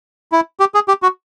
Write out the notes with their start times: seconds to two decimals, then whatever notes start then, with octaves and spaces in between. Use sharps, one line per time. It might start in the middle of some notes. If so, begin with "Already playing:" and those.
0.32 E4
0.60 G4
0.74 G#4
0.88 G4
1.03 F#4